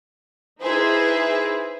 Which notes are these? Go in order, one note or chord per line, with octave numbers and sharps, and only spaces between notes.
D#4 E4 G#4 B4 C5 E5